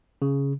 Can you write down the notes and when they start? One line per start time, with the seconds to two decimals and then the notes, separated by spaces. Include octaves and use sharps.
0.22 C#3